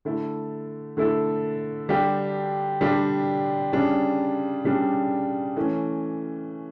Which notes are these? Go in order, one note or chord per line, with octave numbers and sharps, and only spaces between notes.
D3 A3 E4 A4
D3 A3 E4 A4
D3 G3 D4 G4
D3 G3 D4 G4
C#3 G3 D4
C#3 G3 D4
E3 A3 C#4